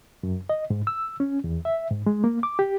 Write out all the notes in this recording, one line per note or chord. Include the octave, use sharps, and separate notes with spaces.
F#2
D#5
G#2
E6
C#4
E2
E5
G#2
G#3
A#3
D6
G4